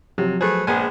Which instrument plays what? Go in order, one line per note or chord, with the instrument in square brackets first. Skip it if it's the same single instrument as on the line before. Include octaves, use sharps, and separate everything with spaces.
[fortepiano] C3 [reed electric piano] F3 F#3
[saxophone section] A3 B4 C5 [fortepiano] G#4
[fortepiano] A#1 G#5 [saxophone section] G#3 B3 C4